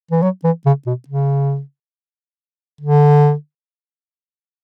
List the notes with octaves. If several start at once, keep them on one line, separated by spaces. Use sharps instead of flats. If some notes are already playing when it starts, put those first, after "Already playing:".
E3
F#3
E3
C#3
B2
C#3
D3